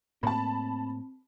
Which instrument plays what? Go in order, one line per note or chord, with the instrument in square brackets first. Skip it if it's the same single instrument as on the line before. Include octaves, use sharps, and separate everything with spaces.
[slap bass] A2 A#3 [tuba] C4 [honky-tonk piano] A5 B5